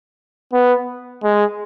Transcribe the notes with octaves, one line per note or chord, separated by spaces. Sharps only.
B3
G#3